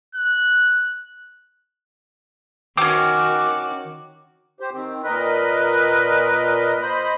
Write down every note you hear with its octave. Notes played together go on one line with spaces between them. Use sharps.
F#6
D#3 C4 C#4 F#4 D6
G4 C5
D#3 C4
A#2 A#4 B4 D#5
C5 D#5 B5